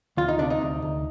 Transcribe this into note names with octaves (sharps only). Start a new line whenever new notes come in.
D2 F4
D#4
C3 D4
D#4
D2
D2